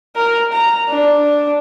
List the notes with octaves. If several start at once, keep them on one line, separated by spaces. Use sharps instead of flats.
A#4
A#5
D4